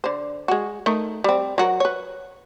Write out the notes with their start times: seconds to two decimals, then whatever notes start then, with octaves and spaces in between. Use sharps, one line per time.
0.04 D3 C5
0.48 G#3 F#4
0.86 A3 D#4 A#4
1.24 G3 C4
1.58 F#3 F#4 A#4
1.80 B4 C#5